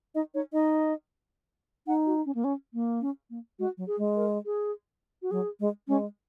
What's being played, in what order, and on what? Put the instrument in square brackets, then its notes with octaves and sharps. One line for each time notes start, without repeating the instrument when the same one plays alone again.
[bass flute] D#4 [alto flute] D#5
[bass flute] D#4 [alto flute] C#5
[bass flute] D#4 [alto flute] D#5
[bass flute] D#4 [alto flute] F#5
[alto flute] F#4
C#4
A#3
C#4
A#3
[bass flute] C#4
A#3
[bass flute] G#3 [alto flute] F#4
[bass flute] F#3
[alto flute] G#4
[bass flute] G#3
[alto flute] A#4
G#4
F#4
[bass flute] F#3 [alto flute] G#4
[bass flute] G#3
[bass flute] G#3 [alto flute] C#4